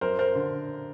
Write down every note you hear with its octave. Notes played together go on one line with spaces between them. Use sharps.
F#2 A#4 C5
A#4 C5
D3